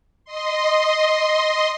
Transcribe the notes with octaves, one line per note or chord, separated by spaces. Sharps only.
D#5 C6